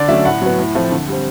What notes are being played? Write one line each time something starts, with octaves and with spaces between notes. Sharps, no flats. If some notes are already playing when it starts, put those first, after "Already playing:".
Already playing: D3 D5
F#3 A3 C#4 E5
A2 F#5
F#3 B3
A2
F3 A3 C4
D3
G3 C4